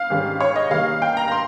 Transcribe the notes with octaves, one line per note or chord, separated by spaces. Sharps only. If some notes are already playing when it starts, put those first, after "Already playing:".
Already playing: F5
G#2 D#3 G3 C#4
C#5
D#5
D#3 G3 A#3 D#4 F5
G5
A#5
A#5
C6